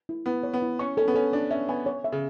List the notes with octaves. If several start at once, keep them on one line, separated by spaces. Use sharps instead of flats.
E4
B3 E4
C#5
B3
E4
C#4 C#6
C#4 A4
B3
C#4 A4
D4 A4
C#4 E5
B3 G#5
C#5
E5
C#3